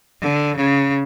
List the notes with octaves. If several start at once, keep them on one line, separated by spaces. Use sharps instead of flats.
D3
C#3